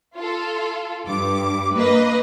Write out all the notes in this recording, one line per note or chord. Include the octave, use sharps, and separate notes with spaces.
F4 A4
G2 D6
A#3 B4 D#5